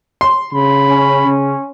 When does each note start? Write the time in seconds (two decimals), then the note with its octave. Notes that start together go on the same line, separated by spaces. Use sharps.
0.21 C6
0.53 C#3 B5
0.88 C#4
1.27 C#3